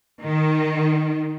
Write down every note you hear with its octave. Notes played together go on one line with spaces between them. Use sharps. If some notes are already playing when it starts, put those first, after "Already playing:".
D#3